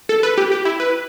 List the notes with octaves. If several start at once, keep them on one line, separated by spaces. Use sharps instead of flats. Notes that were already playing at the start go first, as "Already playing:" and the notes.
A4
B4
G4
G4
E4
B4